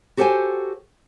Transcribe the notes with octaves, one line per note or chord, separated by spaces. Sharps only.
F#4 G4 A4 C5 G5 G#5